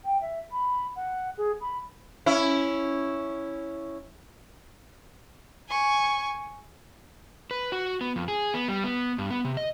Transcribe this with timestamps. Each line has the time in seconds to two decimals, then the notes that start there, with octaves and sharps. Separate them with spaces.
0.05 G5
0.21 E5
0.52 B5
0.96 F#5
1.38 G#4
1.61 B5
2.26 C#4 E4
5.69 G#5 C#6
7.51 B4
7.72 F#4
8.01 B3
8.16 F2
8.28 G#4
8.54 B3
8.68 G3
8.84 B3
9.18 G2
9.30 B3
9.45 C3
9.57 D#5